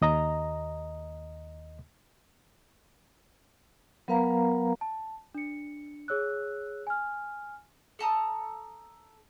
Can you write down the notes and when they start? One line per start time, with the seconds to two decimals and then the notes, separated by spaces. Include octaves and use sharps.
0.02 D#2 D#5 A#5
4.08 F#3 B3 A#4 B4 F5 A#5
4.81 A5
5.34 D4 C#7
6.08 G#4 C#5 E6 F#6
6.87 G#5 F6
7.99 A4 A5 A#5 D#6